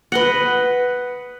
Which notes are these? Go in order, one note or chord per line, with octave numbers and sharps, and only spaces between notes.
B4 D#5 F#5